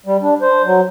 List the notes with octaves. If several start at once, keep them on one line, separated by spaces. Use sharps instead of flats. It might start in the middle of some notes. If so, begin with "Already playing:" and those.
G3
D4
C5
F#3